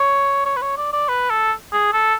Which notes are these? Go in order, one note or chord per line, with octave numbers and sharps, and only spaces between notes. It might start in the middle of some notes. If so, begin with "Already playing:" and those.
Already playing: C#5
C#5
B4
C#5
D5
D5
B4
A4
G#4
A4